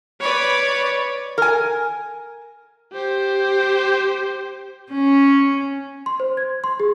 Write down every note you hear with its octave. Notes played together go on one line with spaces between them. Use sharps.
B4 C#5 D5 B5
A#4 G#5
G4 C5
C#4
C6
C5
G#6
C6
G#4